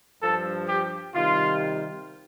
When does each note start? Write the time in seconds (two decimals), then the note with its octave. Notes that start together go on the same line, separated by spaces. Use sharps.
0.22 G2 F3 A4
0.68 G4
1.14 C3 D#3 G3 F4